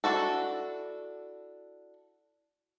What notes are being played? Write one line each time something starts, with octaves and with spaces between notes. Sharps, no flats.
D4 E4 F#4 A4